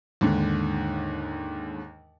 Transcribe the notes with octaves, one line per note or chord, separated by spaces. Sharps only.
D#2 G#2 D3